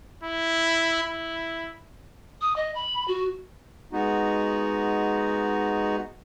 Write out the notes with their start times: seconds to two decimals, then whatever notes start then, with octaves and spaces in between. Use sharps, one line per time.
0.23 E4
1.03 E4
2.41 D#6
2.56 D#5
2.75 B5
3.07 F#4
3.93 G#3 B3 D#4 F#4